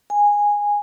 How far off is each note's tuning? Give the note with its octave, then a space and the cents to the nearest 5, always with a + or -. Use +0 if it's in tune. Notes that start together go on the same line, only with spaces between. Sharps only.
G#5 -10